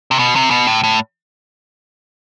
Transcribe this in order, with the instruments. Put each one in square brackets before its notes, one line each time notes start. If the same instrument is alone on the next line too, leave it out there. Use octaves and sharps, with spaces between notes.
[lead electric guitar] C3
B2
C3
B2
A2
A2